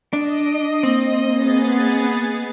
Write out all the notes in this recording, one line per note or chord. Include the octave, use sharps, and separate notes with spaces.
D4 D#5
A#3 C4
B3 G#4 A6